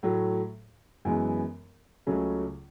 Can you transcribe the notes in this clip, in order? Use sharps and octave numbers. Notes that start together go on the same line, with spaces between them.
A2 F#3 A3
F#2 E3 G#3 B3
C#2 C#3 F#3 A3 C#4